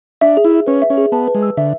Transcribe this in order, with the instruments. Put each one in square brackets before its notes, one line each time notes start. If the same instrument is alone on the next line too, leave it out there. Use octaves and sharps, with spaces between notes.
[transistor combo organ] D4 [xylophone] E5
[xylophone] G#4
[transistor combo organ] E4
[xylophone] G#4
[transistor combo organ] C#4 [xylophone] B4
[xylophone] E5
[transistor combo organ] C#4
[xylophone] G#4
[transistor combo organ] B3 [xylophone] A5
[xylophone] B4
[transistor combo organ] G#3
[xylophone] E6
[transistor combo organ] D3 [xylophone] E5